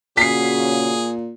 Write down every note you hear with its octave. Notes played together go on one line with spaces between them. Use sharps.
A#2 C#3 F#4 G#4 B6 C7